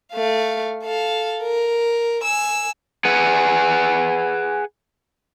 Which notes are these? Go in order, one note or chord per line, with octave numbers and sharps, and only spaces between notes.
A3 F5
A4 F5
A#4
G#5 E6
G#4 B4 F#5 G#5